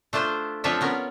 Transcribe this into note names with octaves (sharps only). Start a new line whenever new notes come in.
A3 D4 F4 C5
F3 C4 D4 F4 C#5 E5
B3 C#4 A#4